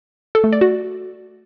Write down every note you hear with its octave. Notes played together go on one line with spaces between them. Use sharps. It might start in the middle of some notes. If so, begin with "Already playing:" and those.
A4
A3
D5
F#4